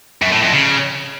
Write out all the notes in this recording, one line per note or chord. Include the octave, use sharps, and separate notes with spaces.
F#2
A2
F2
C#3